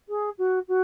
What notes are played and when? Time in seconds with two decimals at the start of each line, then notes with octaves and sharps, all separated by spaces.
0.08 G#4
0.38 F#4
0.68 F#4